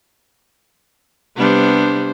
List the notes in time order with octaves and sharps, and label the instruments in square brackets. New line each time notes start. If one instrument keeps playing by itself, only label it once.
[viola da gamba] C3 G3 B3 [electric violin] D4 C5